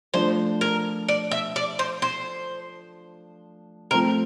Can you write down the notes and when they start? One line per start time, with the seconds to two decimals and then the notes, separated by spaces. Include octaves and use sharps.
0.14 F3 A3 D4 C5
0.61 A#4
1.09 D5
1.31 E5
1.56 D5
1.79 C5
2.02 C5
3.91 F3 A3 C4 A#4